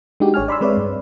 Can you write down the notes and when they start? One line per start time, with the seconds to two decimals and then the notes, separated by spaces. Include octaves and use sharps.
0.20 G#3 D4 D#4 F#4 G4
0.34 G#1 C#5 G#5 F6
0.48 D5 B5 C6 E6
0.61 G#3 C4 B4 C#5 D5 E5
0.77 G2